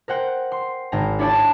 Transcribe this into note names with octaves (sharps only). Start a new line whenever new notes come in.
A#4 C5 F#5 G5
C6
G#1 G5 A#5
D4 E4 C#5 D5 G5 A5